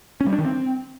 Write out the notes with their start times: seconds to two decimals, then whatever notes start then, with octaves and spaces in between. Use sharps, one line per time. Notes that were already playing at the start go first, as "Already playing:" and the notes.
0.21 C#4
0.27 G3
0.32 D4
0.38 D#3
0.44 C4